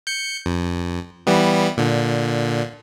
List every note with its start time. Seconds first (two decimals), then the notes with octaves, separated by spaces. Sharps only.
0.07 G6 C#7
0.46 F2
1.27 E3 G3 B3
1.77 A#2 D3